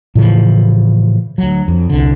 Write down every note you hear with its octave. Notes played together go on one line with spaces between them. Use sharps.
A2 C#3 E3 F3
D2 F#3
F2
C2 D3